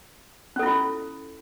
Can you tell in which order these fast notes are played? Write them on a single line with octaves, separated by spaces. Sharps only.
C#4 A4 E4 F4